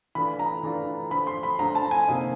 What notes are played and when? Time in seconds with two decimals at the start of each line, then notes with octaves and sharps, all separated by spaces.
0.15 E3 A3 D4 F4 B5
0.39 A#5
0.63 E3 A3 D4 F4
1.11 D3 F3 A3 B5
1.27 C6
1.43 B5
1.59 D3 F3 A3 A#5
1.75 A5
1.91 G#5
2.07 C3 F3 A#3 D#4